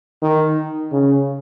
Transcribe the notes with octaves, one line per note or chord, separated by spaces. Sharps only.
D#3
C#3